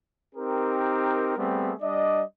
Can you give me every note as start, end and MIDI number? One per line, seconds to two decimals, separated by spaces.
0.35 1.35 60
0.35 1.35 63
0.35 1.35 67
0.35 1.35 70
1.37 1.73 55
1.37 1.73 57
1.37 1.73 59
1.37 1.73 60
1.37 1.73 68
1.81 2.22 55
1.81 2.22 62
1.81 2.22 74
1.81 2.22 75